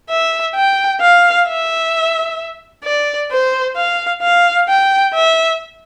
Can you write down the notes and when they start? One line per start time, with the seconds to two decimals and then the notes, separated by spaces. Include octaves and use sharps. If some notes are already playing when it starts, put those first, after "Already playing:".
0.10 E5
0.55 G5
1.01 F5
1.47 E5
2.84 D5
3.31 C5
3.77 F5
4.22 F5
4.68 G5
5.14 E5